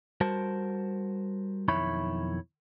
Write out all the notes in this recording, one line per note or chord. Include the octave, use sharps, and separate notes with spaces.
G3 F#4 A#4 C5 A5
B1 F2 D#3 E4 C#5 B5